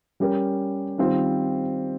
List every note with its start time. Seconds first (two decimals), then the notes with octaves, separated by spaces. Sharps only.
0.20 G3 C#4 G4 A#4
0.98 D#3 G3 C4 F4 C5